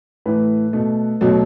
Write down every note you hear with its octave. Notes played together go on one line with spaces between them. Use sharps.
A2 E3 A3 B4
B2 A3
B2 F#3 A3